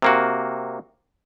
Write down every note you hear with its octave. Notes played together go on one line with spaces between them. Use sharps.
C3 A#3 F#4